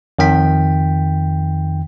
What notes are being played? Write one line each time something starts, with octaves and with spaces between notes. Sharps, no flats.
F2 D#3 G5 B6